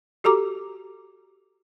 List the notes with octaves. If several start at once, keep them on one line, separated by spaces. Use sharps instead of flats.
F#4 G4 A4 A#5 D6